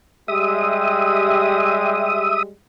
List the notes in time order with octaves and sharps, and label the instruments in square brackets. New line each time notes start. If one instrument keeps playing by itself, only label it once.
[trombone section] G3 G#3 G4 [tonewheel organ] E5 D#6